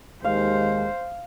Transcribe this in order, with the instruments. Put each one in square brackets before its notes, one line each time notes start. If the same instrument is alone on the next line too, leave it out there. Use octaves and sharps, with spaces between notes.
[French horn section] D#2 G#3 [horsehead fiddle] C5 [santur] F5